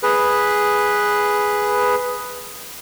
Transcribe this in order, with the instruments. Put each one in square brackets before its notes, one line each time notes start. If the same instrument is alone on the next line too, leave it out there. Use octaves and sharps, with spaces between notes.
[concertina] G#4 B4